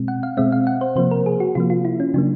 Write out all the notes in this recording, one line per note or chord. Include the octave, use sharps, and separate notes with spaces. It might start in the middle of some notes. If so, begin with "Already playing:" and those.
Already playing: B2 G#3 C4
F#5
F5
B2 G#3 C4 E5
F5
F#5
C5
C3 F3 A#3 C5
A#4
G#4
F#4
C3 F3 A#3 F4
F4
E4
C#4
C#3 F#3 A#3 D4